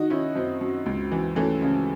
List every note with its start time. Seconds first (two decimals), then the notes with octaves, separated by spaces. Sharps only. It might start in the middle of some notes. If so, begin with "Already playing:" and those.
Already playing: D#3 D#4 F#4
0.10 D#3 C#4 E4
0.35 F#2 C4
0.61 F#2
0.86 C#2
1.12 E3
1.36 E3 A3 C#4
1.62 C#3